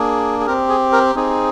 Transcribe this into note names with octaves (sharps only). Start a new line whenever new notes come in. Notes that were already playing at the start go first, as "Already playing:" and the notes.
Already playing: A#3 D4 G#4
G#4
C4 G4 A#4
G#4
A#4
C4 D#4 G#4